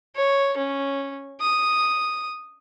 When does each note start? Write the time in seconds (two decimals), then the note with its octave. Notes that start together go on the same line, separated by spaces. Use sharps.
0.16 C#5
0.57 C#4
1.40 D#6